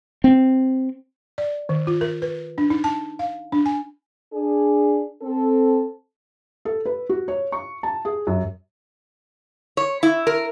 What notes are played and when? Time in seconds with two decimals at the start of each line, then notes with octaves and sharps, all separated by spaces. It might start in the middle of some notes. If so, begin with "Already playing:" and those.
0.24 C4
1.38 D5
1.69 D#3
1.87 F4
2.01 A#4
2.22 B4
2.58 D4
2.70 D#4
2.84 A5
3.19 F5
3.52 D4
3.66 G#5
4.34 D4 G#4
5.22 C4 A4
6.65 A4
6.86 B4
7.09 F#4
7.28 C#5
7.52 C#6
7.83 A5
8.05 G#4
8.27 F#2
9.77 C#5
10.03 E4
10.27 A#4